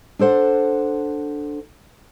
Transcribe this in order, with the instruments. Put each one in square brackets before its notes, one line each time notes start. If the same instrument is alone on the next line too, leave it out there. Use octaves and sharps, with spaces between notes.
[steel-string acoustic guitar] D4 A4 C5 F#5